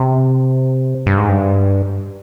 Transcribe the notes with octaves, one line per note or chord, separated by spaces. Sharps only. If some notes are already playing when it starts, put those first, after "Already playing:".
Already playing: C3
G2
G#2
G2